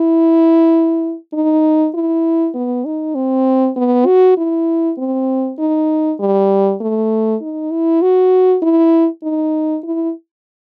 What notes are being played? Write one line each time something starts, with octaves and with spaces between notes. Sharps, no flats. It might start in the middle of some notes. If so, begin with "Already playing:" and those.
Already playing: E4
D#4
E4
B3
D#4
C4
B3
F#4
E4
C4
D#4
G3
A3
D#4
E4
F#4
E4
D#4
E4